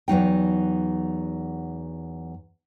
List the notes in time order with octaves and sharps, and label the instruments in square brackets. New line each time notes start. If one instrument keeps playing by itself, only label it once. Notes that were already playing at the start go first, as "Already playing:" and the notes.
[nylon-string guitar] E2 F#3 D#4 G5